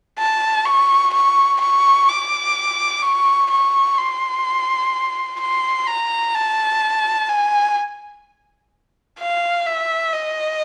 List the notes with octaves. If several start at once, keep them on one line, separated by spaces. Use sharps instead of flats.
A5
C#6
C#6
C#6
D6
C#6
C#6
C6
C6
A#5
A5
G#5
F5
E5
D#5